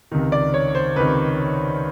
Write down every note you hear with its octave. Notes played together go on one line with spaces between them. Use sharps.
C#2 C3 D#3
D5
C#5
C5
C#2 C3 D#3 B4